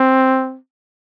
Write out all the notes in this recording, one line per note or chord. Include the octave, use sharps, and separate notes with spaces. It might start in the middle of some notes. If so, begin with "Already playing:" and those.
Already playing: C4